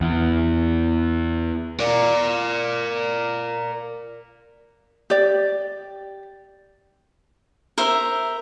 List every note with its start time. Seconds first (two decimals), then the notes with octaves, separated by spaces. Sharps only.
0.01 E2
1.80 A#4 D5
5.10 G4 D5
7.78 A#4 C5 E5